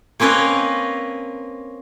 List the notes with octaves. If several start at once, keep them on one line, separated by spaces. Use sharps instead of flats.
A#3 C4 C#4 A#4 B4 D#5